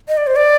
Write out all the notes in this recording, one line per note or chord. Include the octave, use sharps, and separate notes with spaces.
D#5
D5
C5
D5